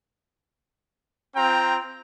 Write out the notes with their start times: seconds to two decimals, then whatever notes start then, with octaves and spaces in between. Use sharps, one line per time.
1.34 C4 F4 G5 A#5